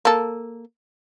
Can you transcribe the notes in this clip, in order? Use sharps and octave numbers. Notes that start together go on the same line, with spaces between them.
A#3 A4